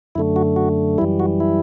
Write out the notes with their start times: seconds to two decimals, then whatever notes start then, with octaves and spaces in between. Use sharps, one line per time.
0.15 F#2 D3 A3 E4
0.36 F#4
0.56 F#4
0.98 F#2 E3 G3 E4
1.20 F#4
1.40 E4